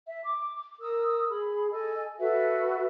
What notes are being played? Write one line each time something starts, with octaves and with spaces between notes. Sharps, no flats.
E5
D6
A#4 D#6 E6
G#4 B5
A4 D#5 G#5
F#4 A4 B4 E5